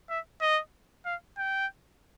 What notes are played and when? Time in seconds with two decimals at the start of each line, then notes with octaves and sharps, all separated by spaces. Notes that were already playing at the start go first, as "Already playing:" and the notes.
0.10 E5
0.41 D#5
1.06 F5
1.38 G5